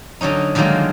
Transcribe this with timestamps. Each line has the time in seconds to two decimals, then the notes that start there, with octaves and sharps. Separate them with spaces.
0.21 D3 F#3 C#4 D#4
0.55 D3 D#3 F3 F#3 G#3 A#3